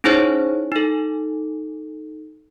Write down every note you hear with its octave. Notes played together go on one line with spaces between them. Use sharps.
C#4 D#4 E4 G#4 C5 C#5
D#4 A4